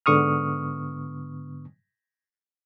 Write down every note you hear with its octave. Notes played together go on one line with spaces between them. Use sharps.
G#2 D3 B3 C#6 D#6 F6